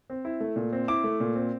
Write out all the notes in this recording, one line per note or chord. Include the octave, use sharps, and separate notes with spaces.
C4
E4
A3
A#2
C4
E4 D6
A3
A#2
C4